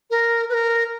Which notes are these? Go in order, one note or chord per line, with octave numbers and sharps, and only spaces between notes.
A#4
B4
A#4